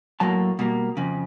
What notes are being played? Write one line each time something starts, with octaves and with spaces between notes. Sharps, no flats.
A2 F#3 A#3 A5
B2 G3 A#3
F2 C#3